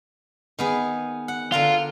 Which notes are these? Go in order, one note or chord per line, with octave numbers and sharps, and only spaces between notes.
D#3 B3 G#4
F#5
D3 F4 A#4 C6